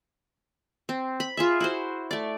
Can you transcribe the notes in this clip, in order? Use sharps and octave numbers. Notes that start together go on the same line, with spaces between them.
C4
B5
F4 G#4 E5
E4 F#4 C5
A3 D5